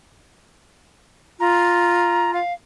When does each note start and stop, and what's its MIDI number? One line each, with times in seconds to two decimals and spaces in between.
1.40 2.39 65
1.40 2.31 82
2.33 2.53 77